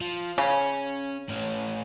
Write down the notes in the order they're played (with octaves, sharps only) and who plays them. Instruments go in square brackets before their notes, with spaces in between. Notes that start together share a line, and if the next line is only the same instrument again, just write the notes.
[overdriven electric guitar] F3
[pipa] C#3 [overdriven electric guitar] C#4
[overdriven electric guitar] A2 C#4